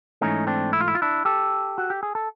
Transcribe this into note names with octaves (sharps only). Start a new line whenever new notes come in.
G#2 E3 A3 C#4 D#4
C4 D4
E4
F4
E4
F4
D4 E4
G4 A4
F#4
G4
G#4
A4